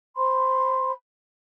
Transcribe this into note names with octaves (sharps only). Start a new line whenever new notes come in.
C5 B5 C6